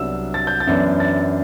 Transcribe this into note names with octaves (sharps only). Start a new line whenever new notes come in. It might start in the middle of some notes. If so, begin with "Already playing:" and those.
Already playing: C2 C3 F#3 B3 D4 E6
A6
G6
A6
F#2 E3 B3 D4
A6